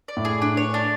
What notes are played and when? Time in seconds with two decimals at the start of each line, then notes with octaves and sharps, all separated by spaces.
0.08 D5
0.17 A2
0.25 G#4
0.42 D4
0.57 C#5
0.74 D4